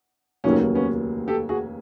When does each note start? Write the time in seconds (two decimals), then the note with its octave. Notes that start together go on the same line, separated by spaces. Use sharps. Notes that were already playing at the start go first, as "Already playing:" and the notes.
0.44 F1 D#2 C#3 F#3 A#3 C#4 D#4
0.75 B3 C#4
1.28 G4 A4
1.49 F#4 G#4